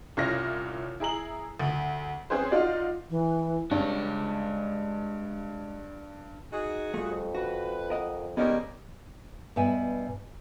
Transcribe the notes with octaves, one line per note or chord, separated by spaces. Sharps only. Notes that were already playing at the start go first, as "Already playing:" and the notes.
C2 C#4 E4 F4 F6 A#6
E4 G#4 A#5 F#7
D2
C4 C#4 G#4 B4 C5
D#4 F4 F#4 D5
E3
G2 G#3 C#5
D#4 F#4 G#4
G3 A3 F4
F2
F#4 B4
A#4 D#5 F#5
D#2 G3 G#3 B3 C#4 D#4 A#4
G2 B2 E5 G#5